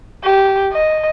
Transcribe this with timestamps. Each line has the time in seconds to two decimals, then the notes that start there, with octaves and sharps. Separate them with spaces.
0.24 G4
0.72 D#5